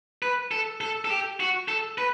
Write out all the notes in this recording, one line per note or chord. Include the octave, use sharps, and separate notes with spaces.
B4
A4
A4
A4
G4
F#4
A4
B4